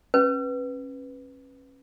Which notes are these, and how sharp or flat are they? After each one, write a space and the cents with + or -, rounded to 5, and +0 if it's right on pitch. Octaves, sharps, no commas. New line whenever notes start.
C#4 -30 B4 +0